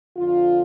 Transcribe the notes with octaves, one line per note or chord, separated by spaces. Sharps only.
F2 D3 F3 F4